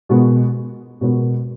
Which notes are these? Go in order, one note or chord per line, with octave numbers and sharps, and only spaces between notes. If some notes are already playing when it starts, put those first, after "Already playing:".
B2 G#3 B3 F#4 A#4
B2 G#3 B3 F#4 A#4